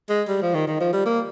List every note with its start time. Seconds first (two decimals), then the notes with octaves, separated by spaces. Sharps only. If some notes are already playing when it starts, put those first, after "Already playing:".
0.09 G#3
0.28 G3
0.42 F3
0.54 D#3
0.67 D#3
0.81 F3
0.93 G3
1.06 A#3